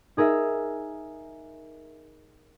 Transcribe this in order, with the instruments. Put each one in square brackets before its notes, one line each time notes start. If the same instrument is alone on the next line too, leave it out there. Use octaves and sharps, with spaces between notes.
[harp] D#4 G#4 A#4 E5